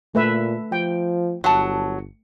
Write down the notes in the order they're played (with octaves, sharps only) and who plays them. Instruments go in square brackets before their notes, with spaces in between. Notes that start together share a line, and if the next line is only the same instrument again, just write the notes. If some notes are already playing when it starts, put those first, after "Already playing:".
[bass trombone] A#2 [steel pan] A3 B4 E5
[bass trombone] F3 [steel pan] G5
[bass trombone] G1 [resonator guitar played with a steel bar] F#3 F#5 A5